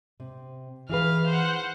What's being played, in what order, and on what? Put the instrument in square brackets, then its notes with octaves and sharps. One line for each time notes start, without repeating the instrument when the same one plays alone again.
[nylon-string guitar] C3
[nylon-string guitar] E3 G#4 B4 [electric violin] F5 F6
[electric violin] C5 F#5